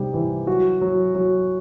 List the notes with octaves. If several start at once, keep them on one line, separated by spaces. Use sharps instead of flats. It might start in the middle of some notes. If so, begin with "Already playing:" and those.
Already playing: C3 G3 D#4 G4
E3
F#3 F#4
F#3
F#3